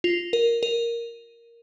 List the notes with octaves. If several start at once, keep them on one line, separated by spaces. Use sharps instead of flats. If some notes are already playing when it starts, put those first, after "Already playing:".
F4
A#4
A#4